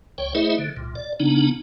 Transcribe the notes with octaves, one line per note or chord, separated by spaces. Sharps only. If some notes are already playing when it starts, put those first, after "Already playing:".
C#2 C#5 G5
A3 E4 G#4 C5 D#5 E5
D3
C2 A#2
D5
C#3 B3 D4 D#4